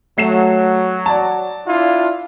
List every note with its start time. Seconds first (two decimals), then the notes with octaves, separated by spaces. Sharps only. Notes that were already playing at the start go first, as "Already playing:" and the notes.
0.18 F#3 A3 C7 E7
1.06 D5 A5
1.66 D4 E4 F4